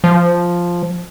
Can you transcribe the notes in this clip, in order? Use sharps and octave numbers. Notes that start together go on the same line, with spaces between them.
F3